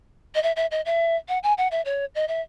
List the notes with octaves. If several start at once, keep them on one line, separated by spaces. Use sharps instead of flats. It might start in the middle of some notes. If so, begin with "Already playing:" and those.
D#5
E5
E5
D#5
E5
F#5
G#5
F#5
E5
C#5
D#5
E5